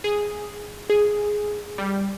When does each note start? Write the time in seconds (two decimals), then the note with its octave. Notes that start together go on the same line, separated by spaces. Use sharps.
0.04 G#4
0.90 G#4
1.78 G3